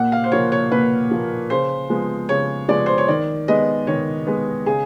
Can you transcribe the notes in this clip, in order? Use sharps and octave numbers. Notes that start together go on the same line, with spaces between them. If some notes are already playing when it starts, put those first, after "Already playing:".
Already playing: A#2 F#5
F5
C5
F3 A#3 C#5
C#5
A#2 B4
F3 A#3
C#3 C5
F3 G#3 B3
C#3 C#5
F3 G#3 B3 D5
C5
C#5
D#3 D5
G#3 B3 D#5
D#3 C#5
G#3 B3
C#3 G#4